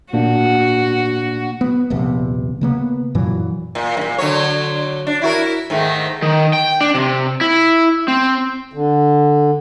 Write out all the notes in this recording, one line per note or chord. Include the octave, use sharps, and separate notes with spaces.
A#2 A#3 D4 F#4
B3
D#1 A#1 C3 B3
C#3 A#3 B3
F#2 A#2 E3 F#3
A#2
G2 A#2
D3 F#3 C#5
D4
E4 F#4 A#4
G#2 D#3 A3
D#3
G5
D4
C3
E4
C4
D3